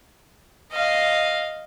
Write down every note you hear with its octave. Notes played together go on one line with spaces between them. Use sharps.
D#5 F5